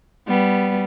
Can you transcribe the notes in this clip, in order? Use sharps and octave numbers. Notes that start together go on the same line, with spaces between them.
G3 B3